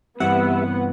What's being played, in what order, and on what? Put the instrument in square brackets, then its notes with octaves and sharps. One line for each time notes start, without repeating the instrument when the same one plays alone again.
[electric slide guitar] G2 E3 C4 [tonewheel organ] G3 E5 [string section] B3 [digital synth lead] F#5